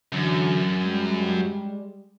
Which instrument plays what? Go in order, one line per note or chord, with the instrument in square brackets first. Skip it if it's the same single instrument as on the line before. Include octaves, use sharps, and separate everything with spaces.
[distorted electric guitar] F#2 [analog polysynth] D3 E3 F#3
[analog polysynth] G3 G#3